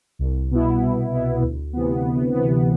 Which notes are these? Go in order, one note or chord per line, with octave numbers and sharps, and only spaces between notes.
C2
B2 B3 E4
C2
B2 B3 E4
D2
C3 E3 B3
D2
C3 E3 B3